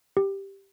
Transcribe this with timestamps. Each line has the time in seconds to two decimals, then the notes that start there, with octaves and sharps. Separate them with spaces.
0.17 G4